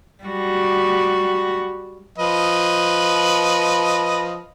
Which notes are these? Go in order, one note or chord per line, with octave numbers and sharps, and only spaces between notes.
G3 F#4
F3 B4 D#5